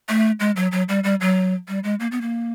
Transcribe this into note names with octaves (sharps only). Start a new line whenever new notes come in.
A3
G#3
F#3
F#3
G3
G3
F#3
G3
G#3
A#3
B3
A#3